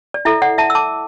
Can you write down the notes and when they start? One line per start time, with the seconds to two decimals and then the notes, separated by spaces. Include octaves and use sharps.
0.14 D5
0.25 E4 A4 E5
0.42 D5 F#5
0.58 E5 A5
0.70 E6
0.75 A5 D6